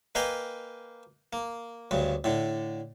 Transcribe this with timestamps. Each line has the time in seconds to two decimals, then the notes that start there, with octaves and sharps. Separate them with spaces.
0.15 A#3 B4 D#5 F5 G5 G#5
1.33 A#3
1.91 D2 G2 C#3
2.24 A2 D3